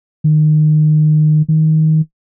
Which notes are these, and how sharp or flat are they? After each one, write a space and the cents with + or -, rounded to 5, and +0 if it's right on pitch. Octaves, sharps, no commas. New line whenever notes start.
D#3 -25
D#3 +15